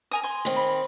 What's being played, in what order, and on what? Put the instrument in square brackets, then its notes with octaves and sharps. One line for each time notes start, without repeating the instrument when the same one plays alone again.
[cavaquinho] A#4 G#5 D#6
G#5 C6
[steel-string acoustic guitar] D#3 C4
[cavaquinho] B5